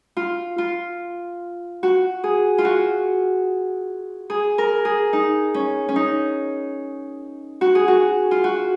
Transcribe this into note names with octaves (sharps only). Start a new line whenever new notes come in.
F4
F4
F#4
G#4
F4
F#4
G#4
A#4
G#4
D#4
C#4
C#4
D#4
F#4
G#4
F#4
F4
F#4